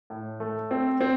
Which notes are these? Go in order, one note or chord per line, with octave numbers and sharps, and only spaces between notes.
A2
A3
C4
C4